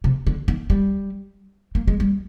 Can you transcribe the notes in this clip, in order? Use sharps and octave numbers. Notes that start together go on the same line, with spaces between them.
C3
D3
D#3
G3
A#3
G#3
G3